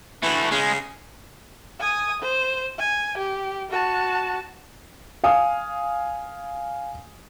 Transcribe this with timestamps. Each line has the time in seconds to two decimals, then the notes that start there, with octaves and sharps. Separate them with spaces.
0.22 E3 A3 F#4
0.51 C#3 G#3
1.80 G#5 D#6
2.23 C5
2.79 G#5
3.18 G4
3.72 F#4 A5
5.24 F5 G#5 D#6